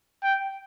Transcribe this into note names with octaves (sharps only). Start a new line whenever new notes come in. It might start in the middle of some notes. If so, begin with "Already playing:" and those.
G5